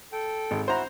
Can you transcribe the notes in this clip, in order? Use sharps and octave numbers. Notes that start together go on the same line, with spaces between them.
A4 G5
G#1
E4 F#4 C5 A#5